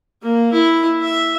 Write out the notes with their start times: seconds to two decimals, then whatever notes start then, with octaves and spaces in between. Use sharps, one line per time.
0.22 A#3
0.53 E4
1.02 E5